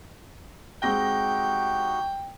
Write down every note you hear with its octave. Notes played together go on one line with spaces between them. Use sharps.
G#3 C4 D#4 F#4 G4 G5 A#6